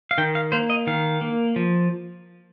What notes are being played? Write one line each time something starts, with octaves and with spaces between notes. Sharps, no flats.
F5
D#3 G5
F5
A#3 C5
D#5
D#3 F5
A#3
F3